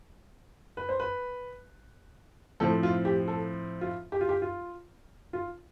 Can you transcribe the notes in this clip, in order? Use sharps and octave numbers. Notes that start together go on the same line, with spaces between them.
B4
C5
B4
A2 F3 C4 A4
F4
G4
A4
F4
G4
F4
G4
F4
F4